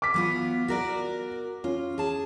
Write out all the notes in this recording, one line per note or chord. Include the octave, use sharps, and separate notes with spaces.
D6 B6
F#3 B3 F4
F#4 A#4 D5
C#4 F4
G#4 A5